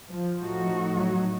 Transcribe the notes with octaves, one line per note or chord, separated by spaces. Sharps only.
F3
A2 A3 D#4 F#4
F#3